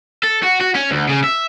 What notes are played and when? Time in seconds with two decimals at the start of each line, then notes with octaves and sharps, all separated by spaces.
0.23 A4
0.43 F#4
0.60 F#4
0.75 C#4
0.91 D2
1.09 C#3
1.24 E5